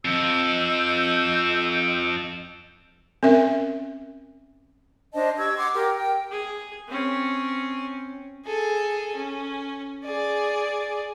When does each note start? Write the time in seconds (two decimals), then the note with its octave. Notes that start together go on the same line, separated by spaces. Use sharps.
0.05 F2 D#5 E6 G6
3.23 C4 C#4 A#4 E5
5.14 D4 C5 D#5 A5
5.38 G4 C#6 E6 G#6
5.57 F#5 C6 D6
5.73 G4 A#4 G5
5.95 G5
6.31 G#4
6.87 C4 C#4
8.46 G#4 A4
9.16 C#4
10.04 G#4 D5